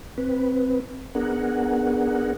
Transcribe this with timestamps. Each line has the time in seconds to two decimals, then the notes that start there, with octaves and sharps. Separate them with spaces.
0.18 C4 B4
1.15 B3 D4 G#4 A#4 F#5